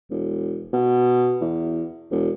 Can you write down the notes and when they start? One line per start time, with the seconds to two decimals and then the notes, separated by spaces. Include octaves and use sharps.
0.10 E1
0.73 B2
1.41 E2
2.10 E1